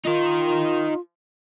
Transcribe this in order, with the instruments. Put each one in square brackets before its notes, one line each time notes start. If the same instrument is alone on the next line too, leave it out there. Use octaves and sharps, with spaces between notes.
[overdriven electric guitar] D#4 A#4 [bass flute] F4